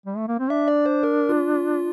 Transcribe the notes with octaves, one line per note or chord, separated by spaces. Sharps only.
G3
A3
A#3
C4
D4 E5
D5
C5
A#4
F4